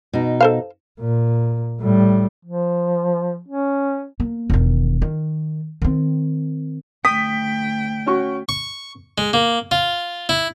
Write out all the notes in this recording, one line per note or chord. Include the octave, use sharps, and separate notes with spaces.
B2 D#4
A4 C5 F5
A#2
A2 G3
F3
C#4
A#3
E1 D#3
D#3
D#3 C4
D2 G5 D#6 B6
C#4 F#4 C#6
C#6
G#3
A#3
F4
E4